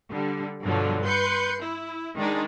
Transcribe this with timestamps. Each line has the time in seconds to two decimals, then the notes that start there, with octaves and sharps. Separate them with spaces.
0.10 D3 G3
0.63 G2 B2 D3 F3 F#3
1.03 B4 C6 G6 C#7
1.62 E4
2.17 D#3 G#3 D4 D#4